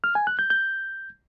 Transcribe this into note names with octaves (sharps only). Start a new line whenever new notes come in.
F6
G#5
F#6
G6
G6